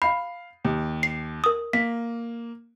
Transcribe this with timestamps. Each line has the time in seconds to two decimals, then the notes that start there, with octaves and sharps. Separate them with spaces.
0.02 F5 B5 C7
0.65 D#2
1.03 C7
1.44 A#4 D#6
1.73 A#3 B6